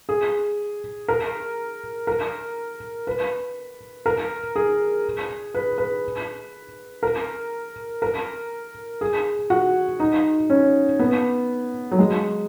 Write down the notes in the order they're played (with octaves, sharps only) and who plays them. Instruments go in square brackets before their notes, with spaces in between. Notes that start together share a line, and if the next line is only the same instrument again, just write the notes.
[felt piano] G#4
A#4
A#4
B4
A#4
G#4
B4
B4
A#4
A#4
G#4
F#4
D#4
C#4
B3
F#3
G#3